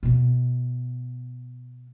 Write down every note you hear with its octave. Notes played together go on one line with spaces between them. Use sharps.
B2 B3